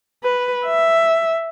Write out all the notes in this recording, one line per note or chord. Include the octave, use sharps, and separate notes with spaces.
B4
E5